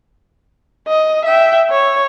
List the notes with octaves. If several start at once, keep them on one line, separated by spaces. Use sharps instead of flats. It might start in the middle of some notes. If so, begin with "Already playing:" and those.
D#5
E5 G5
C#5